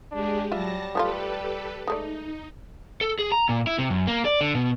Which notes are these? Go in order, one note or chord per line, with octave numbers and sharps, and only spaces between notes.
G#3 D4 G4 G#4
F#3 G3 F4 E5 A5 A#6
F3 A3 F4 G4 A4 B4
G#3 A3 D#4 D5
A4
G#4
A#5
A#2
E4
C3
F#2
A#3
D5
D3
B2